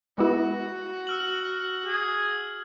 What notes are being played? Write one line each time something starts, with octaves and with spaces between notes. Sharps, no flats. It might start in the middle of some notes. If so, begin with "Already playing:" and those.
G#3 B3 E4 F#4
E6 F6 F#7
G#4